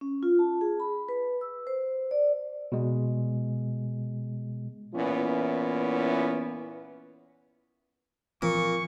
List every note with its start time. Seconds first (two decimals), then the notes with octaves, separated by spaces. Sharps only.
0.01 C#4
0.23 F4
0.39 A5
0.61 G#4
0.80 B5
1.09 B4
1.41 E6
1.67 C5
2.11 D5
2.72 B2 G#3
4.95 A#2 E3 B3 C#4 E4
8.42 A#2 E3 F3 C4 C#6